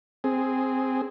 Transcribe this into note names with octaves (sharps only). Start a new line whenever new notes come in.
C4 G#4